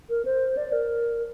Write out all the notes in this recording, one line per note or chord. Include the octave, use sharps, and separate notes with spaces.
A#4
C5
D5
A#4